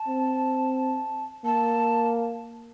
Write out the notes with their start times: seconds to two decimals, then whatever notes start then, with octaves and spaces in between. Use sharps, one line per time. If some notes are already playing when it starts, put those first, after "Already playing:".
Already playing: A5
0.08 C4
1.45 A#3 A5